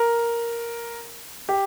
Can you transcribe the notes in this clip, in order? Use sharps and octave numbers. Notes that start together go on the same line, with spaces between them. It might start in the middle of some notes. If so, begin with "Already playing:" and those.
Already playing: A#4
G4